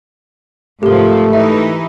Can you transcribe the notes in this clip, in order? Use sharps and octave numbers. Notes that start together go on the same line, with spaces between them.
G#2 C3 F3 A3 G4 A#4
E3 D#4 E5